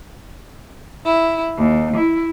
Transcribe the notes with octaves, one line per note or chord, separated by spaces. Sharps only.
E4
D#2
E4